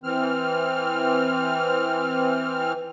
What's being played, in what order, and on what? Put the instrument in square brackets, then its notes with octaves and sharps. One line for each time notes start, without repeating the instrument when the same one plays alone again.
[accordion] E3 C4 F6